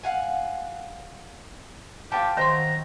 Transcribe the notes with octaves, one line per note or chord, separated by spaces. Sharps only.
F5 F#5 G#5
F3 G4 F5 G5 A5
D#3 F#3 C4 C5 A#5 C6